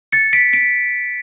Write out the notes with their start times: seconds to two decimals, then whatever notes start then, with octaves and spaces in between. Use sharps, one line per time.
0.12 A6 C#7
0.33 B6 D7
0.53 B6 D7